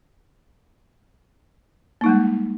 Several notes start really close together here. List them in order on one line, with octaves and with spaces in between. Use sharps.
A#3 D#4 G3 G#3